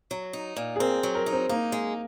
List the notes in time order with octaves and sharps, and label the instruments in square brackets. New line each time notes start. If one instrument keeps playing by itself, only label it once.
[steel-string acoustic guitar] F#3
D#4
A#2
[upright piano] G#4
[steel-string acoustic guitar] C4 [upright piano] A#4
[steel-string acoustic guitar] F#3
[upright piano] A#4
[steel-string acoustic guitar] D#4
[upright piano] C4
[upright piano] A#3 [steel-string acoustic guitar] D#4
[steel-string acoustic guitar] G#3